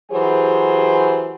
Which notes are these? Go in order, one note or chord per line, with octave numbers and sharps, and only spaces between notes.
E3 F#3 G4 G#4 C5